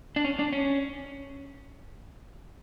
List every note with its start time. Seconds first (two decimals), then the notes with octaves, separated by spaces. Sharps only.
0.16 D4
0.25 C#4
0.39 D4
0.53 C#4